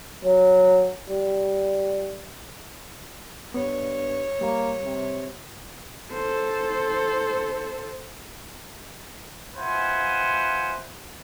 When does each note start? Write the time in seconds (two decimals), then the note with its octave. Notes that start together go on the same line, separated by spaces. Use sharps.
0.24 F#3
1.09 G3
3.54 G2 B3 C#5
4.41 G3 A#3
4.83 C3
6.13 A4 C5
9.56 F4 B4 C5 E5 F#5 G#5